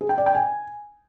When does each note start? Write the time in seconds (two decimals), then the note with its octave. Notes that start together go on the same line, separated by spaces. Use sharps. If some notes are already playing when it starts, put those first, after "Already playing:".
0.01 G#4
0.09 G5
0.18 D5
0.26 G5
0.35 G#5